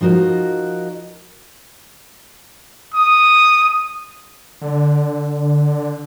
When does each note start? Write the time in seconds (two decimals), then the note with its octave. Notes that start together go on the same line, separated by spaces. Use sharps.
0.01 F3 D#4 F#4 A#4
2.94 D#6
4.62 D3